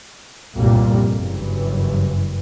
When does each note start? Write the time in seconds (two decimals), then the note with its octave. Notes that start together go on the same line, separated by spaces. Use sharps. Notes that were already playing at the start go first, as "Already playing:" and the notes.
0.55 G1 C2 F2 A#2 G3 A#3
1.14 F#1 G2 E3